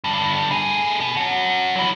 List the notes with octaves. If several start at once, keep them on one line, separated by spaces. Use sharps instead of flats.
G2 D3
A3 G#4
B2
C#4 F#4
E3 F#3